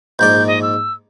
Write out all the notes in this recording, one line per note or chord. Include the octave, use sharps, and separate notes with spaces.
A#1 G#2 D5 G6
D#5
E6